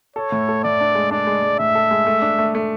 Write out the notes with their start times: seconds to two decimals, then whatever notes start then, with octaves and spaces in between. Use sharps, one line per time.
0.16 A4 C#5
0.32 A2
0.49 A4
0.64 A2 D5
0.80 D4
0.95 G#3
1.11 D4 D5
1.27 G#3
1.43 G#3
1.59 A2 E5
1.75 A4
1.91 G#3
2.07 A3
2.22 D4
2.39 A3
2.55 A3